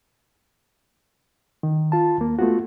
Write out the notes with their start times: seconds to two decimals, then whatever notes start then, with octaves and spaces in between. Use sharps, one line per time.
1.63 D#3
1.92 F4 A5
2.18 D#2 A#3
2.39 A3 B3 F4 F#4